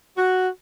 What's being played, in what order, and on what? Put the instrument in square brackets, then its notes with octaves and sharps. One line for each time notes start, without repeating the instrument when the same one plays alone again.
[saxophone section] F#4